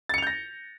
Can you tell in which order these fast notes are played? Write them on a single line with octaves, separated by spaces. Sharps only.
A6 C#7 F7 G6 A#6